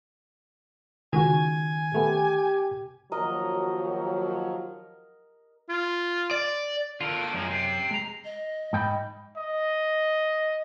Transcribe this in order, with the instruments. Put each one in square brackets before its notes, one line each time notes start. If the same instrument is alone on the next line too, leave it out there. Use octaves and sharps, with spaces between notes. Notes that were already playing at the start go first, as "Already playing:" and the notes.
[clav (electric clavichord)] C#2 F#4 [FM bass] D#3 [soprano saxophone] G#5
[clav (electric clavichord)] A3 B3 [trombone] G4
[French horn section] D#2 F3 F#3 [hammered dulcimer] A#4 D#5
[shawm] F4
[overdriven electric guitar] D5
[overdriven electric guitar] D3 A#4 [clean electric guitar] F4
[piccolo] D7
[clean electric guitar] F#2 [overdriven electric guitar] F3 G#3 [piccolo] A#5
[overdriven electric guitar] C3 [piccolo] C7
[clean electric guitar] G#3 A#5
[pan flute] D#5
[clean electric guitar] G#2 G5 B5
[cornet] D#5